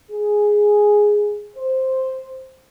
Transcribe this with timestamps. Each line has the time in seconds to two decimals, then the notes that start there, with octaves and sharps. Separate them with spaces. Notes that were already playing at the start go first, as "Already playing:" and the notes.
0.11 G#4
1.56 C5